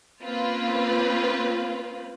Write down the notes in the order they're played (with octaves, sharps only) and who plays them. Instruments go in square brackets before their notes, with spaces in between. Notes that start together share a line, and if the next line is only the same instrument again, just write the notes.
[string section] A#3 C4 C#4 F4 B4